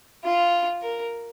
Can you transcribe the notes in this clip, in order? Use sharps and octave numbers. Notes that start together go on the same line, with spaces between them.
F4
A#4